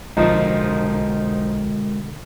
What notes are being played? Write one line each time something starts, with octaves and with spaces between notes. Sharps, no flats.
B1 B2 D3 F3 G#3 D#4 F#4 A#4